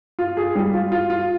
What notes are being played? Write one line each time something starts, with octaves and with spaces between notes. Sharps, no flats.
F4
G#4
G3
F4
F4
F4